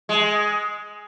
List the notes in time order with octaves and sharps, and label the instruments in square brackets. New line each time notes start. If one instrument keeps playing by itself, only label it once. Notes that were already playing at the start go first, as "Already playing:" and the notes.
[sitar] G#3